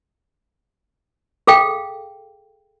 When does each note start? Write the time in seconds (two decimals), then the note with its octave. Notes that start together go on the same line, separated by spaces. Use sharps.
1.47 G#4 A4 F5 G5